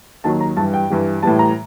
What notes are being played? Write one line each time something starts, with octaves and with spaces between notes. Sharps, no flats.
D#2 D#3 F#3 A5
A#5
G2 E3 G3 A5
G5
G2 E3 G3
A2 E3 G3 A5
A#5